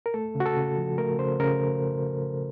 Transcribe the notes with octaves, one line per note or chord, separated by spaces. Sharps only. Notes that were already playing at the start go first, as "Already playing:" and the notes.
A#4
A3 A4
C#3
F#4
A4
C#3
F3
A3 A#4
C#3 C5
C#3 A#4